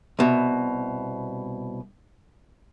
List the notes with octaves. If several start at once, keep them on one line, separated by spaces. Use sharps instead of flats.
C2 B2